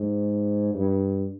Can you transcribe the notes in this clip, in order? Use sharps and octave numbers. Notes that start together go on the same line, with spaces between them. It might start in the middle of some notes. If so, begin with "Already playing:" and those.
Already playing: G#2
G2